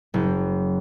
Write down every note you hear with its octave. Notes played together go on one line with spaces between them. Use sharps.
F#1